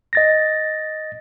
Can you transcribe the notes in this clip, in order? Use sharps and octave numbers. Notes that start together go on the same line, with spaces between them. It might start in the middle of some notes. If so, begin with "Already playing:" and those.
D#5 A6 A#6